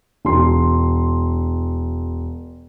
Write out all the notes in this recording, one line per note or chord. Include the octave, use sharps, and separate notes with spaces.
E1 C6